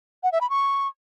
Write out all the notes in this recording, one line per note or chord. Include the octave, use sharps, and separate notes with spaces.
F#5
E5
B5
C#6